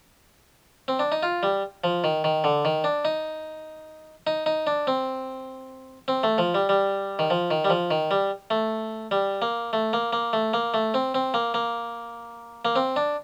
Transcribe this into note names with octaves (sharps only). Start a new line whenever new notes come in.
C4
D4
D#4
F4
G3
F3
D#3
D#3
D3
D#3
D4
D#4
D#4
D#4
D4
C4
C4
A3
F3
G3
G3
D#3
F3
D#3
G3
F3
D#3
G3
A3
G3
A#3
A3
A#3
A#3
A3
A#3
A3
C4
C4
A#3
A#3
A#3
C4
D4